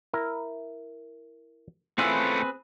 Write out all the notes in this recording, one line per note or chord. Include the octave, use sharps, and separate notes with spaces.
E4 A#4
A3 C4 C#4 E4 F4 G#4 B4 E5